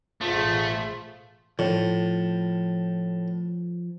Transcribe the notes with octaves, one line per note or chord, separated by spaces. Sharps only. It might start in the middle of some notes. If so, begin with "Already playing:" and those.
A1 B2 F3 A3 F4 G#4 B5
A2 F3